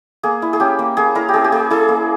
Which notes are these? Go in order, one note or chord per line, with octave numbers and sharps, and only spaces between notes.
A#3 G#4
E4
G#4
C#4 G4
A#3
A#3 G#4
E4 A#4
G4
C#4 G#4
G4
A#3 G#4
E4 G#4
A#3